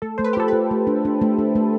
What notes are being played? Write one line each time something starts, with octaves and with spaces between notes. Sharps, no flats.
A3 A4
A3 C5
B4
G4
F4 A4
F4 B4
A3
D4
D4
A3
D4
A3